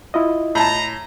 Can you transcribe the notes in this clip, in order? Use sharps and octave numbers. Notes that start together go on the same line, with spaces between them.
E4 F4 D#5
A2 A5 A#5